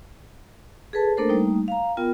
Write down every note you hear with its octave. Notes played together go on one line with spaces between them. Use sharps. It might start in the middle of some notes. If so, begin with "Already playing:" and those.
G#4 A4 B4 A5
A3 A#3 D4 A4 A#4 C5
G3 A3 A#3 D#4
F5 A#5
B3 F4 A#4 G5